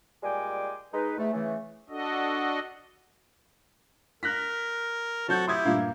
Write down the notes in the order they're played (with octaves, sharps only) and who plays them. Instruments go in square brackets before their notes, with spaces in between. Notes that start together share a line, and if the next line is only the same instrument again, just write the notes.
[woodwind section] A#2 G3 G#3 G5 G#5 D6
G#3 D#4 B4
E2 A3
C#3 E3 A3
[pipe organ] D4 F#4 A4 D#5
[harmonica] A#4 [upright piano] F#6 A#6 B6
[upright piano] F#3 C4 G6 [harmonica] F#4 A4
[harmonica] E4 G4 [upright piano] C6 D#6 G#6
[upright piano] G2 A#2 A#3